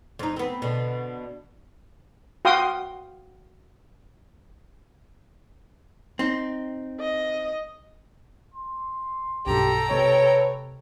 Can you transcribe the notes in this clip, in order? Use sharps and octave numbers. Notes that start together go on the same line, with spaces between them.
F2 D#4
B3 C4
B2 D3
F#4 F5 G5 C6 D#6
C4 D#4
D#5
C6
B1 G2 B2 G4 A4 G5 A#5
C3 G#3 B4 C#5